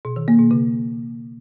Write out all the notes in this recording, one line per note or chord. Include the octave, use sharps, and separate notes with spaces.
B2
D#3
A#3
B2
C#3